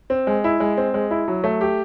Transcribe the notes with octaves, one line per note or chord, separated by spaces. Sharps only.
C4
G#3
E4
G#3
C4
G#3
E4
F#3
A3
G4